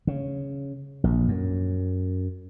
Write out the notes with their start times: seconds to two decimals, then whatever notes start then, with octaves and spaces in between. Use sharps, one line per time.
0.07 C#3
1.04 A#1
1.28 F#2